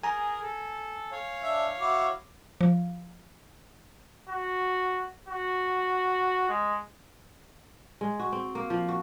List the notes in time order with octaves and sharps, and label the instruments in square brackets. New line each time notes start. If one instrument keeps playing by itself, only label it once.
[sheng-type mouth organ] G#4 A#4 [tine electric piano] G#5 A#5
[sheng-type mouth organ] A4
C#5 F5
[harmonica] D4 E5
E4 F#4 D6
[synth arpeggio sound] F3
[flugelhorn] F#4
F#4
G#3
[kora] G#3
F#4
C4
A#3
F3
F#4